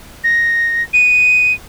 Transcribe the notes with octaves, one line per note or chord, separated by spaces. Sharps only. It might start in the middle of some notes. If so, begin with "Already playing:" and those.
A#6
D#7